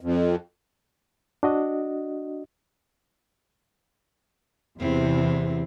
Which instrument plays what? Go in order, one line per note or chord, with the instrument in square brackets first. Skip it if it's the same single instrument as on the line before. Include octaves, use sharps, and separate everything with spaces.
[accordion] F2
[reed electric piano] D4 F#4 D#5
[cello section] E2 C3 [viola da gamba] E3 C4